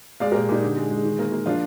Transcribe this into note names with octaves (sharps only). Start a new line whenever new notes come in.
G#3 D5 F5
G4 A#4
A#2
A#2 D#4 G4
D3
G#3
G#3
D#3
A#3
A#3
F3 D4 F4